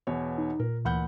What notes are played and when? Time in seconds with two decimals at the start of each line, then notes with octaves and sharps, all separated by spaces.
0.07 E2 B2 C#5
0.38 D#4
0.59 A#2 A#4
0.85 D2 A#2 E3 F#5 B5 G6